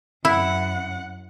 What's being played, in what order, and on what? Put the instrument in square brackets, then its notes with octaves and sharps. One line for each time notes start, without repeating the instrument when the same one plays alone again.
[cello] F#2 F#5 [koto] E4